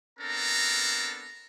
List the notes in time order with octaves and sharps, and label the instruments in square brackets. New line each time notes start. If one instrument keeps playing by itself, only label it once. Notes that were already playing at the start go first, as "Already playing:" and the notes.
[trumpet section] B3 C4 D4 A4 A#4 A#5